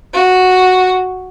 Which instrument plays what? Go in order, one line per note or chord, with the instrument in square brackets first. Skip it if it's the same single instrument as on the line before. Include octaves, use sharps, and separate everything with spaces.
[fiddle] F#4